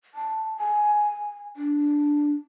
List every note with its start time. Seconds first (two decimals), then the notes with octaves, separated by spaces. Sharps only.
0.15 A5
0.58 G#5
1.57 D4